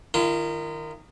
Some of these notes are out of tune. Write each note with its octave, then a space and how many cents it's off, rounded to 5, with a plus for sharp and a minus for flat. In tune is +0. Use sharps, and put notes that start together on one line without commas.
D#3 -15 F4 -45